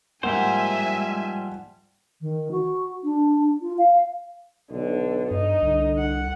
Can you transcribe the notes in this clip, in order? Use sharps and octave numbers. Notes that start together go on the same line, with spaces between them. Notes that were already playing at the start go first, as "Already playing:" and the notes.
G#2 F3 G3 A#3 C5 E5 F#5 G#5
D#3
F#4
D4
F4
F5
B1 D3
G2 D#4
C2 D3
F#5